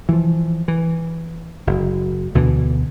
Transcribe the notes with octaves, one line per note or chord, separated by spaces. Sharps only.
E3 F3
E3
F#1
D2 B2 D3 E3